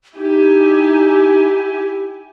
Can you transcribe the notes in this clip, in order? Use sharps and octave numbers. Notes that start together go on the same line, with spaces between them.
D#4 E4 G4 G#5